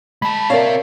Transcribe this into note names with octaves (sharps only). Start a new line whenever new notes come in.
G#3 A5 B5
C4 A#4 C#5 D5 E5 F5